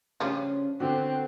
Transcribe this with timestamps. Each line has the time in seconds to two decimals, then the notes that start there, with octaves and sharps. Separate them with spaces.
0.20 C#3 F3 G3 C#4 D4 F4
0.80 D3 B3 C4 D4 F#4